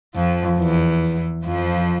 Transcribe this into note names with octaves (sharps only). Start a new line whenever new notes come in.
F2 F3
E2 E3
F2 F3